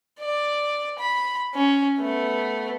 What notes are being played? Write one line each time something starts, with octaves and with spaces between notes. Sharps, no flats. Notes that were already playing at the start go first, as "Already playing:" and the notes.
D5
B5
C#4
A3 B3